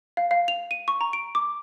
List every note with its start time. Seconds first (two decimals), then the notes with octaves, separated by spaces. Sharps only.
0.17 F5
0.31 F5
0.48 F7
0.71 D#7
0.88 C#6
1.01 A#5
1.13 D7
1.35 D6